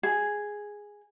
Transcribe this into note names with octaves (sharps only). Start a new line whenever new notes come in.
G#4